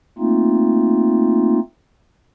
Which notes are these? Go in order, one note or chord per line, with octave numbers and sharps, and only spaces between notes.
A3 A#3 C4 D#4 F4